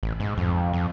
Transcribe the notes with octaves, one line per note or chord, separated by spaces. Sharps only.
A1
G#2
F2
F2